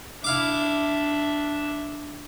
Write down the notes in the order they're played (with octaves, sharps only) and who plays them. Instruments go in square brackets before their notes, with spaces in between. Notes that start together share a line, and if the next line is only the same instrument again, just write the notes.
[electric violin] D4 E5 [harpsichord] E4 F5 D6